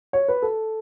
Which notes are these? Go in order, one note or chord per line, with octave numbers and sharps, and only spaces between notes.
C#5
B4
A4